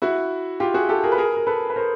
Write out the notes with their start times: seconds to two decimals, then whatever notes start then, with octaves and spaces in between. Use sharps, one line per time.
0.02 E4 F#4
0.60 F4 G4
0.74 F#4 G#4
0.89 G4 A4
1.03 G#4 A#4
1.12 B4
1.18 G#4 A#4
1.37 A#4
1.47 A4 B4
1.70 B4
1.76 A#4 C5